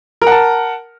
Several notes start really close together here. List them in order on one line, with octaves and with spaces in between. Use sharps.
A#4 F#5 A5